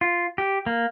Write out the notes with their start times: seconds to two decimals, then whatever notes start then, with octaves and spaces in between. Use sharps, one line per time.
0.01 F4
0.38 G4
0.66 A#3